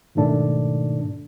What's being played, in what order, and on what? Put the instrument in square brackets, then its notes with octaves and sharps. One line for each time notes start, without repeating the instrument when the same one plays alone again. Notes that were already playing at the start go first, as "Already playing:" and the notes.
[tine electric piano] G#2 B2 D#3 A3 D4